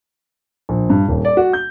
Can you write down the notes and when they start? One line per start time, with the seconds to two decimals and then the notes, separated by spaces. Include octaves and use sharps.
0.69 A#1
0.90 G2
1.08 D#1
1.25 D5
1.37 F#4
1.53 G6